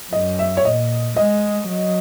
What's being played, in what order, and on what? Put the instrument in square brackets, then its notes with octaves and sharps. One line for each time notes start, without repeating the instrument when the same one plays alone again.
[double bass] F#2 [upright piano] D#5
[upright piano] E5
C#5
[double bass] A#2 [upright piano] D#5
[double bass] G#3 [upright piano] D#5
[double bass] F#3